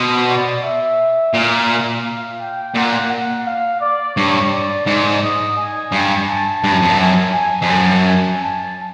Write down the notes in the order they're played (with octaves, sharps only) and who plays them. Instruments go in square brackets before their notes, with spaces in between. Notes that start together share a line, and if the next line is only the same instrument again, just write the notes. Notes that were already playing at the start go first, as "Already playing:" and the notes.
Already playing: [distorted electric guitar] B2 [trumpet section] C5
[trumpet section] D5
E5
[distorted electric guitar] A#2 [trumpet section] F5
[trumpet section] G5
[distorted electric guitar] A#2 [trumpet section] F#5
[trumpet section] F#5
F5
D5
[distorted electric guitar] G2 [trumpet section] C#5
[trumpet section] D5
[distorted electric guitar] G#2 [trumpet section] D5
[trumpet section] D#5
G#5
[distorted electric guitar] G2
[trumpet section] A5
[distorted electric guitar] G2
F#2
F2
F#2
[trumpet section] G#5
G#5
[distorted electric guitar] F2
[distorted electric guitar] F#2 [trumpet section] A5
[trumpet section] G#5
A5